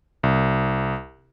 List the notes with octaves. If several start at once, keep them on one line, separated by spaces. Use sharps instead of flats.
C2